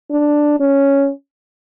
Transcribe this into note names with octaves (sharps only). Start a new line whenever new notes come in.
D4
C#4